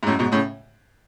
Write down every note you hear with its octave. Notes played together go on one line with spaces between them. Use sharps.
G#2
F#2 A2
G#2 B2
A2 C#3